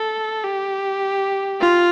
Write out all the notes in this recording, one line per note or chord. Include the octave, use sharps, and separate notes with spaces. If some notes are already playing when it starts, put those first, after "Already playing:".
Already playing: A4
G4
F4